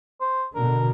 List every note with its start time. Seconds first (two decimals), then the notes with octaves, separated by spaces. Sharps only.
0.21 C5
0.55 B2 D3 A#4